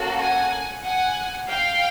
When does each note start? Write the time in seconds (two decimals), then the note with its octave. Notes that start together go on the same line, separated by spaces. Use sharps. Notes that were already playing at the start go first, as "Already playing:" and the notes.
Already playing: A#3 C#4 F#4 A4
0.19 F#5 G#5
0.84 F#5 G#5
1.49 F5 G5